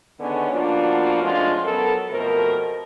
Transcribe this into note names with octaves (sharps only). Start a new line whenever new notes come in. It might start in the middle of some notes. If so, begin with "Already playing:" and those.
D3 D#3 G#3 B3 C#4
F3 A#3 B3 D4 F4 F#4
F3 G#3 A3 C#4 D4 F4
F#3 B3 A4 A#4
F2 B2 A3 A#4 C5